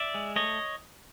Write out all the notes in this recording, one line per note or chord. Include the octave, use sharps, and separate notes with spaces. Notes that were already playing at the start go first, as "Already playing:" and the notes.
Already playing: D5 E5
G#3
A3 C#5 D#5